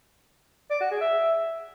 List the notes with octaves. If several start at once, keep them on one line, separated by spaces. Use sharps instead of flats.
D5
F#4
G#4
E5